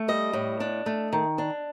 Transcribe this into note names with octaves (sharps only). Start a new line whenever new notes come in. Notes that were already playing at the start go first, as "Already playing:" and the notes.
Already playing: A3
G3 D#5
A2
D4
A3
D#3
D4